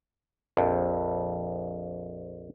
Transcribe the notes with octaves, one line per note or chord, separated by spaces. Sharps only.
A#1 F2